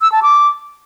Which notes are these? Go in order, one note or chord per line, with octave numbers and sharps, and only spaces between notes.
E6
A5
D6